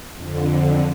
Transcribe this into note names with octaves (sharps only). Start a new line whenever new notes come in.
F2 D3